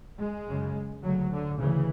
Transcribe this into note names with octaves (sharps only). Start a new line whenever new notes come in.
G#3
F#2 C#3
D2 C#3 F#3
D3
D2 C#3 E3